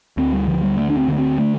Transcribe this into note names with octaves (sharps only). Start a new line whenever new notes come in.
D2 C4
G3
D3 F3
G3
D2 A3
D4
C4
D3 A3
C4
A3